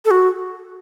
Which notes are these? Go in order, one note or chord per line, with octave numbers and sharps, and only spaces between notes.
A4
F#4